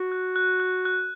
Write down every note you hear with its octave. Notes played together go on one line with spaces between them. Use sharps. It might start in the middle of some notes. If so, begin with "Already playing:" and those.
Already playing: F#4
F#6
F#6
F#6
F#6